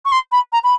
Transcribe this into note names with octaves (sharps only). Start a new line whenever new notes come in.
C#6
C6
B5
A#5
B5